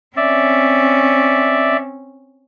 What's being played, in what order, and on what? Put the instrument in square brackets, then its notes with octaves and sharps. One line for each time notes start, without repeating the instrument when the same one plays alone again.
[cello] C4 C#4 [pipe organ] D5 E5